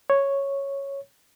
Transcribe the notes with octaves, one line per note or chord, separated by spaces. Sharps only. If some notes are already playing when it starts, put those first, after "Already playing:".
C#5